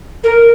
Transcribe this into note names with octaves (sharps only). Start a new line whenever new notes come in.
A#4